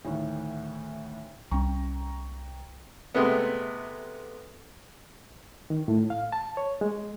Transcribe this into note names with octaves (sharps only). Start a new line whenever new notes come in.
D2 A2 D#3
C2 C#4 G5 A#5 C#6
C3 G#3 A3 B3
D#3
A2
F5
A5
C#5
G#3